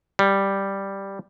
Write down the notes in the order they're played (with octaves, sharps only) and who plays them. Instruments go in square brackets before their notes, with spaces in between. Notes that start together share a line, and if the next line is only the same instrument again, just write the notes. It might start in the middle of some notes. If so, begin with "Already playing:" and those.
[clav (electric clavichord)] G3